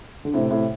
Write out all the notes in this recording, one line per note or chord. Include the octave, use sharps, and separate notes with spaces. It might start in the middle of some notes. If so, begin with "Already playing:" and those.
D3
A2 C3
A2 C3